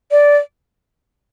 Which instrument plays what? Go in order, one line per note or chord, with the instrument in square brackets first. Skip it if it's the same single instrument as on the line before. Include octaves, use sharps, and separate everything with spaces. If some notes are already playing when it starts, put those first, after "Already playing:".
[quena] D5